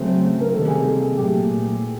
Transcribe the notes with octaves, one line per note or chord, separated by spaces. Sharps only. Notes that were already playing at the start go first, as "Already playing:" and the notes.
Already playing: C#3 F#3 A3 C4
A#4
C3 D#3 G3 A#3 A4
G#4
A4
G#4
A#2 F#3 A3 G4